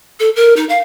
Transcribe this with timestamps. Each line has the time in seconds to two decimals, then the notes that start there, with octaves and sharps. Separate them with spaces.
0.20 A4
0.36 A#4
0.56 D#4
0.69 F5